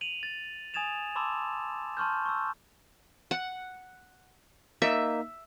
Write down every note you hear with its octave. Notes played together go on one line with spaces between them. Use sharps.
D#7 F7 F#7
A6
G#5 D#6 G#6 A6 E7 F7
A5 B5 C6 D6 E6 E7
A5 C6 C#6 F6 G6
C#6 E6
F#5
A#3 D#4 E5